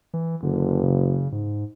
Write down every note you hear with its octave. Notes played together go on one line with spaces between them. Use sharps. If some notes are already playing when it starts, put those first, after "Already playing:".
E3
F#1 D3
C#3
G#2